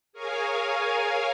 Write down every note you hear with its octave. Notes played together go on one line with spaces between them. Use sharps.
G#4 A#4 C#5 F5 G#5